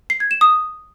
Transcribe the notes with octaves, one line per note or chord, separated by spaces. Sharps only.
C7
G#6
E7
D#6